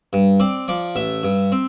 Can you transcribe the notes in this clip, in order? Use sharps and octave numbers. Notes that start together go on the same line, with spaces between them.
G2
C4 D5
F3 D5
A1 E5
G2
C4